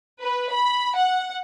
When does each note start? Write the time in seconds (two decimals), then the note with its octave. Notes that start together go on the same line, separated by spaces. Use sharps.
0.22 B4
0.52 B5
0.96 F#5